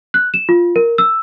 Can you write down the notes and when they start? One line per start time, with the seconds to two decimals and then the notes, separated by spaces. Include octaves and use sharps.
0.14 F#6
0.34 E7
0.49 F4
0.76 A#4
0.98 E6